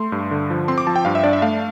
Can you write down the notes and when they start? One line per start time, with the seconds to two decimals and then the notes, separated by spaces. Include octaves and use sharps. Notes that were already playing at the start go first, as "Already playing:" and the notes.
Already playing: A3 C6
0.12 G2
0.31 D3
0.50 F3
0.68 C4 C6
0.78 D6
0.87 F3 A5
0.96 G5
1.05 G2 F5
1.15 E5
1.24 D4 D5
1.33 E5
1.42 A3 F5